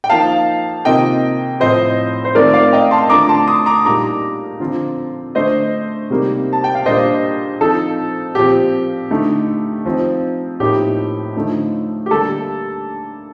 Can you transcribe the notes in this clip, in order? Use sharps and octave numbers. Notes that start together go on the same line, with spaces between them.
G5
F3 A#3 D#4 F5 A5
C3 D#3 A#3 F4 D#5 G5
A2 F3 C4 C5 D#5
C5
D#3 A3 C4 F4 A#4 D5
D5 F5
D#5 G5
A5 C6
D3 A3 D4 F4 A#5 D6
A5 C6
C6 D#6
A#5 D6
A#2 G3 A#3 D#4 A#5 D6
D3 F3 C4 F4
D3 A3 D4 C5 D#5
C3 G3 A#3 D#4
A5
G5
F5
A#2 G3 A#3 D4 C5 D#5
F3 C4 D#4 A4
A#2 F3 C4 G4
D3 A3 D#4
F3 C4 D#4
A2 F3 A#3 D#4 G4
D3 F3 A3 D#4
G4
D3 G3 A#3 A4